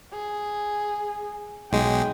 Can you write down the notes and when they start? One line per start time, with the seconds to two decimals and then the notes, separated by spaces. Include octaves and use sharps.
0.13 G#4
1.72 B1 G#3 G5